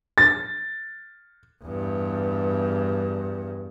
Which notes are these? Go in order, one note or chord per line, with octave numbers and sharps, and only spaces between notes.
A6
E2 G2